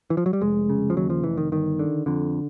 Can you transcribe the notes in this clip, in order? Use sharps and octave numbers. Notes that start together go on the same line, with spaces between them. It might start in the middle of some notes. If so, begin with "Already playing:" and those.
E3
F3
F#3
G3
F1 G#3
C#3
F3
D#2 F#3
F3
F1 E3
D#3
G1 D#3
D3
F2 D3